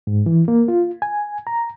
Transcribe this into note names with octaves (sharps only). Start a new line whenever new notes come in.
G#2
E3
A#3
F4
G#5
A#5